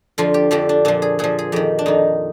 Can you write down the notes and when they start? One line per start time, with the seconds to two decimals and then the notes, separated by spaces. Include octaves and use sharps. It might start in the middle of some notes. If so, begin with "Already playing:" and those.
0.18 F2 D3 F3 F4
0.34 G4
0.51 F2 D3 F3 G4
0.69 D4
0.85 A#2 F3 D4
1.02 G#4
1.19 A#2 F3 G#4
1.39 G#4
1.52 F2 D#3 G4
1.79 D4
1.86 F2 D#3 D#4